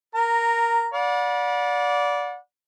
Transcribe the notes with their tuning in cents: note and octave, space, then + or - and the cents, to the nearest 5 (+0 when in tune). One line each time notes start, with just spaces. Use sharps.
A#4 +0 A#5 -10
D5 -15 F#5 -40 B5 -35